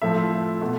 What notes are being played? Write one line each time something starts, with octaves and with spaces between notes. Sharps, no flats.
A2 F3 A3 C4 E5
F4
B2 A3